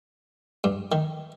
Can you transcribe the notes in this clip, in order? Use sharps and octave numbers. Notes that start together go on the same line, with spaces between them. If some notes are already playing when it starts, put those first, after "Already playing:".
G2
D#3